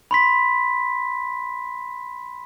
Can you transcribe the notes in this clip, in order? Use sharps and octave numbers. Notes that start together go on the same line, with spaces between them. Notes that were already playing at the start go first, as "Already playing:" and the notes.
B5 C6 B6